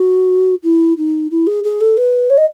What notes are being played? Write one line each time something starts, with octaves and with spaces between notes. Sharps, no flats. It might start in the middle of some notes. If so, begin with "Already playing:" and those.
Already playing: F#4
E4
D#4
E4
G#4
G#4
A4
B4
C#5
D#5